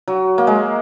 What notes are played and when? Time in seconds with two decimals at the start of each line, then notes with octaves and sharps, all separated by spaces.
0.08 F#3
0.38 A#3
0.47 G#3